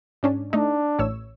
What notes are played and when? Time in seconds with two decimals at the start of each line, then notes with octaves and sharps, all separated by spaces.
0.23 G#2 C#4 D4
0.53 A3 D4 D#4
0.99 A1 C#5 E6